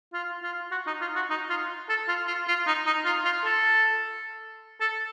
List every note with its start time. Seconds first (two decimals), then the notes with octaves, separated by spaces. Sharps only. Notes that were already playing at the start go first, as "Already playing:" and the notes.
0.13 F4
0.43 F4
0.71 F#4
0.87 D#4
1.01 F4
1.16 F#4
1.30 D#4
1.50 F4
1.89 A4
2.08 F4
2.27 F4
2.48 F4
2.67 D#4
2.86 D#4
3.05 F4
3.25 F4
3.45 A4
4.81 A4